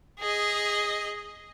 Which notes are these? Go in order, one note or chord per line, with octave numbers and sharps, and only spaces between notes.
G#4 D#5